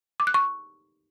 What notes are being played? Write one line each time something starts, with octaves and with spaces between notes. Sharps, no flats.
D6
F#6
C#6